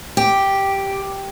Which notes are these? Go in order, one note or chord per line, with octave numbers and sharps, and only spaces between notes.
G4